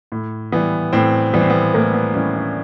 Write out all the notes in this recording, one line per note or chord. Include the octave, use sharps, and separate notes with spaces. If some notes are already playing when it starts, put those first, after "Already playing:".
A2
E3 G3 B3
A2 C4
E3 G3 B3
C4
B3
A2 A#3
B3
E3 G3 C#4
D4